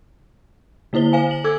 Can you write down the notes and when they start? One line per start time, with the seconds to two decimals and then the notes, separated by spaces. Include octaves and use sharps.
0.93 D3 A#3 E4 C5 G7
1.13 C5 F5 G#5
1.31 F#7
1.44 A4 D6 E6 G#6